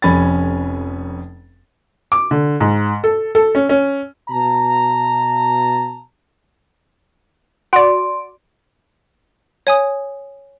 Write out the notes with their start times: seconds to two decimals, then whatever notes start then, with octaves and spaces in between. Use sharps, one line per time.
0.02 F1 F2 C#4 G#5 B5 A6
2.12 D6
2.31 D3
2.61 G#2
3.04 A4
3.35 A4
3.55 C#4
3.69 C#4
4.29 B2 A5 A#5
7.73 F#4 D5 C6 D7
9.67 C#5 G#5 D#6